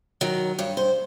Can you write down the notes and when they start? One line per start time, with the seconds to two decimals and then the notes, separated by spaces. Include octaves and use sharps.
0.21 D#3 F#3
0.59 G2 C#5
0.77 C5